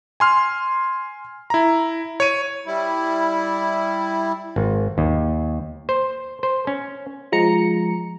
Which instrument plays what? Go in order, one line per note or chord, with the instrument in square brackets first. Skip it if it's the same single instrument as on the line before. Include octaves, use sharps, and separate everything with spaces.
[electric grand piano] G#5 C6 F6
E4 A#5
C#5 D#7
[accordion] G3 E4
[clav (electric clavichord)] G#1
D#2
C5
C5
C#4
[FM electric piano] F3 G#3 A#5 C#7